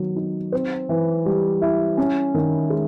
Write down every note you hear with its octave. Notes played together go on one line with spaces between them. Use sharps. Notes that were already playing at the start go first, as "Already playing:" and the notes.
Already playing: D#3 F#3 B3
D#4
C4
E3
G3
E4
C#4
D#3
G#3